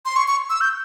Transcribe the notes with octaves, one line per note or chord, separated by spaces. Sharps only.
C6
C#6
C#6
E6
G6